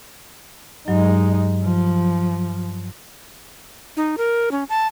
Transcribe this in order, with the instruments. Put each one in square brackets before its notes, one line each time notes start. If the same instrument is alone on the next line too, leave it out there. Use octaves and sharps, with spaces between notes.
[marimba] G2 F#3 [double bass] G#3 D#4
[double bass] F3
[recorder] D#4
A#4
C#4
A5